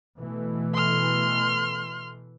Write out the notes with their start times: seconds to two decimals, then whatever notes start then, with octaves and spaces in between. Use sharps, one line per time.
0.18 B2 E3 A3
0.73 C6 F6